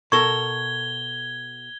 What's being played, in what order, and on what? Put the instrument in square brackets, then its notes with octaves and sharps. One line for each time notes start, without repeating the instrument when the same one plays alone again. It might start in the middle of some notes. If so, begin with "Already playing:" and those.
[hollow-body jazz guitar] B2 A4 A#4 [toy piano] C#6 [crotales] G#6 G7